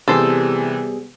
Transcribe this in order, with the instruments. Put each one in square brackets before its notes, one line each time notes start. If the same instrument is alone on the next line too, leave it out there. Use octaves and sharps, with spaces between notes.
[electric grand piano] C3 E3 [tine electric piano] G3 B3 G#4 [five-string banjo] A4 C5